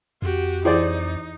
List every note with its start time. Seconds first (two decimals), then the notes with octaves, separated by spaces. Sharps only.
0.22 F2 F#4 G4
0.65 E3 D#4 E4 G#4 C5 D5